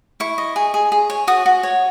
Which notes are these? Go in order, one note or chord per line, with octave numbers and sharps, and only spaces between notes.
E4 C#6
D#5
G#4
G#4
G#4
C#5
F#4 D#6
F#4
C#5